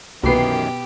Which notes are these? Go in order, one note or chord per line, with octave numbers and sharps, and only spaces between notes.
C2 F#2 B2 D#3 E3 B3 G4 C7